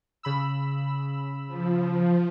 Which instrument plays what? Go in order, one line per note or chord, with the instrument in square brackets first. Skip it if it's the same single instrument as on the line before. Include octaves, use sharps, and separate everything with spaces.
[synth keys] C#3 B5 E6
[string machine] F3